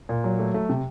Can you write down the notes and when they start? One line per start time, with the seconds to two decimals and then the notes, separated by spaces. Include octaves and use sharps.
0.09 A#2
0.24 F#3
0.39 A3
0.54 A3
0.69 C3